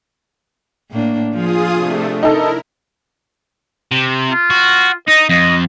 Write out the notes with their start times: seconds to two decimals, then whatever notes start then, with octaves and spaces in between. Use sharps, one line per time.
0.91 A2 A#3 D4
1.33 F3 F4 G#4 D#6
1.73 C3 A3 D4
2.23 D#4 E4 A4 A#4
3.92 C3
4.31 F4
4.50 F#4
5.08 D#4 D#5
5.30 F2 D#5